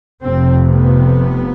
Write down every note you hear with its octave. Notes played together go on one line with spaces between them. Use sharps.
F1 F2 C3 C4
B3